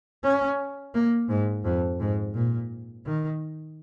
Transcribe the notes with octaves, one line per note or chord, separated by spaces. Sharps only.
C#4
A#3
G#2
F2
G#2
A#2
D#3